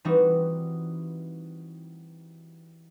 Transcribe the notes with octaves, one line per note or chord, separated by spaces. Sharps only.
E3 G3 C4 D#4 F#4 B4